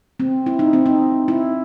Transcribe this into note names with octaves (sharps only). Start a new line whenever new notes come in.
C4
E4
D#4
C4
D#4
E4